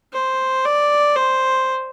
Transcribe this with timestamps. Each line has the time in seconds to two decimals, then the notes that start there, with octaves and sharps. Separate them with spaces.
0.13 C5
0.65 D5
1.16 C5